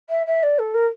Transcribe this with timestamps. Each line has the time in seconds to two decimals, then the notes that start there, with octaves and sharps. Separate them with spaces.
0.09 E5
0.26 E5
0.43 D5
0.58 A4
0.74 A#4